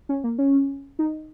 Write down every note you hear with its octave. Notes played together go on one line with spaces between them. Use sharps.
C#4
A#3
C#4
D#4